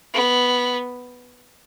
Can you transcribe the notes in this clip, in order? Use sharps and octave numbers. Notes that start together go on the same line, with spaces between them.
B3